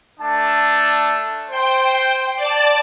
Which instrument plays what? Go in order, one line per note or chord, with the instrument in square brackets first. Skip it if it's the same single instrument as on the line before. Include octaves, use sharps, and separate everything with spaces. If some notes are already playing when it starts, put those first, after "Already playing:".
[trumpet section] A3 D4 A5
[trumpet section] C5 [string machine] G5
[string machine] D5 A5